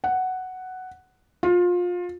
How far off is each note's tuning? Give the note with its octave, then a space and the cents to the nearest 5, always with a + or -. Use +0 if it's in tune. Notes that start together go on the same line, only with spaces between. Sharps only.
F#5 +5
F4 +25